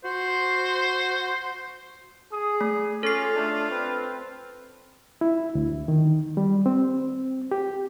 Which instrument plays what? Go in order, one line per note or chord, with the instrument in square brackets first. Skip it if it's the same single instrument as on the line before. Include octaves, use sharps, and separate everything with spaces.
[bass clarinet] F#4 [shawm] C5
[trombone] G#4 [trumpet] D#6
[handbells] A3
[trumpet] C#4 [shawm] F4 [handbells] A4 C7
[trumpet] A3 [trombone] D4
[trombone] C4 [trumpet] B4
[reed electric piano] E4
D2
D#3
G3
C4
G4